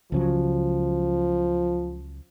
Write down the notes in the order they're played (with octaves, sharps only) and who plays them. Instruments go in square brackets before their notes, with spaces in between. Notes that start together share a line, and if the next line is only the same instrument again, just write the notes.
[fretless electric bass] C#2 C#3 F#3 [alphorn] F3